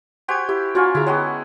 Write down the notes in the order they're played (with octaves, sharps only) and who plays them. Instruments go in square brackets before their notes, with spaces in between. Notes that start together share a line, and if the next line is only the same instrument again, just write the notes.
[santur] F#4 G4 C5 [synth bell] G5 G#5 G#6
[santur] E4 [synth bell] G4
[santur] C#4 F4 A#4 [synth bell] F#4 F#5 G#5
[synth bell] D3 G#4 [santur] E4 A#5
[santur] G#3 B3 F#4 [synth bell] C#5 G5 A#5